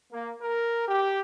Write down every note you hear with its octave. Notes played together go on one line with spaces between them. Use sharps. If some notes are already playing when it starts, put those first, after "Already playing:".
A#3
A#4
G4